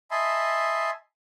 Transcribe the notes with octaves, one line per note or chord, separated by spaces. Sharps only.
D#5 E5 G#5 A5 B5 C6